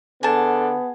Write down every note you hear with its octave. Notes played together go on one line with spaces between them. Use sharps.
D3 B3 G#4 A5